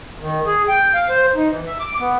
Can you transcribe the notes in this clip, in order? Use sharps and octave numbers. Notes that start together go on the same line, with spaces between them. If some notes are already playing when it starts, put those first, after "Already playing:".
D#3
G#4
G5
F5
C5
D#4
E3
E5
D6
B3